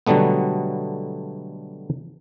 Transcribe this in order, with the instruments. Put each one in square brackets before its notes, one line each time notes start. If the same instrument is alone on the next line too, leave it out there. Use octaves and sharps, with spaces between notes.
[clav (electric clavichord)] B2 D3 F#3 G3 A3 B3